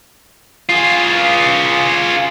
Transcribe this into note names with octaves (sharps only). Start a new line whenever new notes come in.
F4 G#4